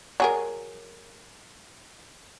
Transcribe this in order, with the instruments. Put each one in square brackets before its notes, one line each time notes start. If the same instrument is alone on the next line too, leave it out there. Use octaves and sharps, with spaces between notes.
[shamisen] F#3 G#4 A#4